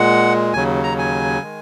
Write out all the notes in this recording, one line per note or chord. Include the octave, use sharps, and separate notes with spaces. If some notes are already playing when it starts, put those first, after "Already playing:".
Already playing: A#2 G#3 F#5
D#2 C#3 F#3 G#5
A#5
G#5
D#3 G#3